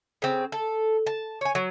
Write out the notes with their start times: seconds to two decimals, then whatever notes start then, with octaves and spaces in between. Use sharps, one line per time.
0.22 C#3 C4
0.52 A4
1.07 A5
1.41 C#5 G#5
1.55 F#3